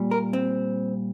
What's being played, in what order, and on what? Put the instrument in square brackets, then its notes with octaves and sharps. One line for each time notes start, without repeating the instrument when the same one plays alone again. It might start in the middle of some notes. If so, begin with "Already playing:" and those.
Already playing: [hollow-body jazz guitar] A#2 G3
A#4
C4